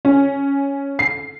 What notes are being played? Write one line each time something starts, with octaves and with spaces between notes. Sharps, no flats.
C#4
C7